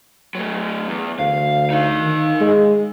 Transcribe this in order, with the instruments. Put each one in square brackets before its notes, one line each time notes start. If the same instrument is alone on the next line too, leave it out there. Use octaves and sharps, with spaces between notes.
[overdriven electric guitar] F#3 A3
E2
[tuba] D2 [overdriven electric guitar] F5
[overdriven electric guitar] D#4 F5
[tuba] D#3
G#3